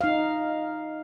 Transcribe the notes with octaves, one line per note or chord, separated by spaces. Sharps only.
D#4 F5